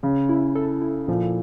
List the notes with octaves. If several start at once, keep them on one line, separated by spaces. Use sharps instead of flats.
C#3 C#4
E4
A4
E4
A#2 F3